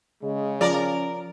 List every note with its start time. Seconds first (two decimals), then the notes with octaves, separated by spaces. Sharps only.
0.23 C#3 G#3
0.61 F3 C#4 A#4 D5